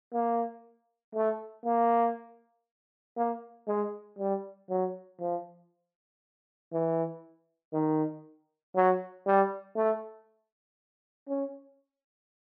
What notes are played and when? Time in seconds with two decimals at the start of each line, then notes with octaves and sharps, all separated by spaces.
0.13 A#3
1.15 A3
1.65 A#3
3.17 A#3
3.67 G#3
4.18 G3
4.69 F#3
5.21 F3
6.73 E3
7.73 D#3
8.75 F#3
9.26 G3
9.76 A3
11.29 C#4